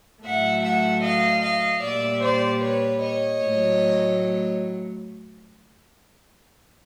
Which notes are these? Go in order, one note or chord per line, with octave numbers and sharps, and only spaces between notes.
A2 F#3 A3 E5 F#5
E5 F#5
D#5 F5
D#5 F5
A#2 G3 D5 E5
C5 D5
B4 C#5
C#5 D#5
A2 F#3 A3